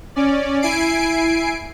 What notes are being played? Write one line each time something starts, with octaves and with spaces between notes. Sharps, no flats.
C#4 D5
E4 G#5 C7 D7